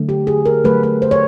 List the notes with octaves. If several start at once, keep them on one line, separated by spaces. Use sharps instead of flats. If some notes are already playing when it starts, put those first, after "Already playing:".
Already playing: D3 F#3 A3
G4
G#4
A#4
D3 F#3 A3 B4
B4
C5
C#5